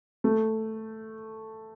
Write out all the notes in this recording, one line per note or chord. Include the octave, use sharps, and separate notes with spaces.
A3